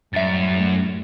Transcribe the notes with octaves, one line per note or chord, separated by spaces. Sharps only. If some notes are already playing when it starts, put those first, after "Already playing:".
F#2 A2 G3 A3 E5 A6